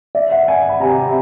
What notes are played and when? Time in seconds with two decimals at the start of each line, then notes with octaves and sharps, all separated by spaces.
0.15 D5 E5
0.31 E5 F#5
0.48 F#5 G#5
0.69 B5
0.81 C3 G#5 A#5